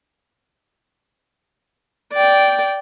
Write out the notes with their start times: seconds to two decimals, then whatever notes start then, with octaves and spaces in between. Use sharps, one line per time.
2.13 D5 G5